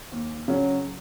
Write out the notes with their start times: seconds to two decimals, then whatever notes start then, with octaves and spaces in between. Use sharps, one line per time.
0.12 D#2
0.48 C#3 F#3 C#4